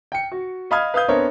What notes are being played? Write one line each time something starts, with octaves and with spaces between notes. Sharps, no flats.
G5 C#7
F#4
D#5 F5 B5 D#6 F6 G#6
B4 F5 D#6 G6
B3 C4 D4 A#4 C#5 E5